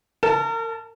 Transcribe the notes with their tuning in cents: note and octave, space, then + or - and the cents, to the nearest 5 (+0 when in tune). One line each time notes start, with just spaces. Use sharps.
A#4 -35 A5 +0